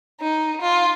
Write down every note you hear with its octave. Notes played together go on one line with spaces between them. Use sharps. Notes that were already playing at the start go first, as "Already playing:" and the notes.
D#4
F4